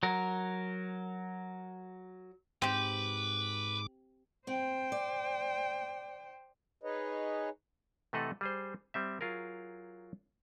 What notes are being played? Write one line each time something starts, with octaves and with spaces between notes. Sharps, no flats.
F#3 A#4
G#2 C4 G4 B4 D6
C4 C5 G5
D5
D#4 G#4 B4 C#5 D#5
C3 E3 A3 A4 D#5 F#5
G3 G#4 C5
G3 C4 E5
F#3 F4 G#4 A#4